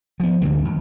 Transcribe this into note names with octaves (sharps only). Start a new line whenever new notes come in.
F3 B3
D2 G#2 D3 G3
D#2